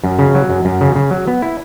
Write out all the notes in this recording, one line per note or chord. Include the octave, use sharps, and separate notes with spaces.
F#2
C#3
F#3
F#2
F#2
C#3
C#3
F#3
B3
E4